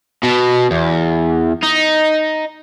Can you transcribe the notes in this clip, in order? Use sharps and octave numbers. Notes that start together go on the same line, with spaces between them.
B2
E2
D#4